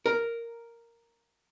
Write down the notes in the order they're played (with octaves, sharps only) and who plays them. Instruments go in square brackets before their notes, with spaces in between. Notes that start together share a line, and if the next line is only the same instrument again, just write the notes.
[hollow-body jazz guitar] A#4